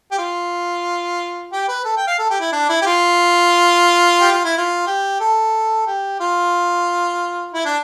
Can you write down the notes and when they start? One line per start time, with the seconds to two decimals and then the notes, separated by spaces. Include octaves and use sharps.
0.11 G4
0.18 F4
1.53 G4
1.68 B4
1.85 A4
1.97 G5
2.08 F5
2.19 A4
2.30 G4
2.41 E4
2.52 D4
2.69 E4
2.82 G4
2.86 F4
4.20 G4
4.32 F4
4.45 E4
4.58 F4
4.87 G4
5.20 A4
5.87 G4
6.20 F4
7.54 E4
7.65 D4